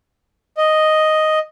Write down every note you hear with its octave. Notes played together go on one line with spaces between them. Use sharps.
D#5